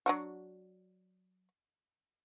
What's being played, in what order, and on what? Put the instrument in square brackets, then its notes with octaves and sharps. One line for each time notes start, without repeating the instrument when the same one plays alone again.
[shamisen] F#3 D4 F#4